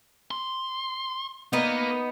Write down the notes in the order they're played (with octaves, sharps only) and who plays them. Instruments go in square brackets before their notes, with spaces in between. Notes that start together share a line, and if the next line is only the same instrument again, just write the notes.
[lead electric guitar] C6
[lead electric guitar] A#3 A#4 [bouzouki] B3 D#4